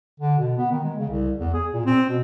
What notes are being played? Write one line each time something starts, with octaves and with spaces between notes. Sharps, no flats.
D3
B2
B3
D#3
G#3
C#3
C2
E2
G#4
A#2
C4
B2